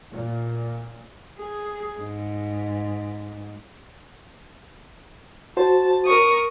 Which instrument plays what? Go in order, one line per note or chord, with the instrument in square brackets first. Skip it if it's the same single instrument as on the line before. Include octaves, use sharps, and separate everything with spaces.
[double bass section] A#2
[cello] G#4
G#2
[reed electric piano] F#4 C5 [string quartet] A5
[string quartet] A#4 C#6 D#6